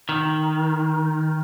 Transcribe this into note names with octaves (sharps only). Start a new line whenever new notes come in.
D#3